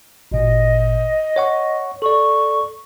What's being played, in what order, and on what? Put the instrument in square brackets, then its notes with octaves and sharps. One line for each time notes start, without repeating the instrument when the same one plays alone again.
[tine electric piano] G#1 A#2 [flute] D#5
[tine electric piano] C#5 F#5 C#6
[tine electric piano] A4 D5 [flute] C#6